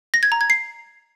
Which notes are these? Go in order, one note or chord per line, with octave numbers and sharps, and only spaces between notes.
A#6
G#6
A#5
G#6
C7